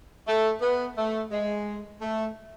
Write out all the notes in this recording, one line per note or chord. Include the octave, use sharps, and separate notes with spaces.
A3
B3
A3
G#3
A3